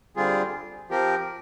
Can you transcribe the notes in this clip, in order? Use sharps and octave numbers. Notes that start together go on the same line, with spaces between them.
D3 G3 C4 F4 G#4
F3 C4 G4 A#4